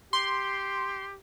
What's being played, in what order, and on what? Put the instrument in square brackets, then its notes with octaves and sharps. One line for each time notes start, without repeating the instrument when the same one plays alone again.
[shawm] G4 [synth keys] C6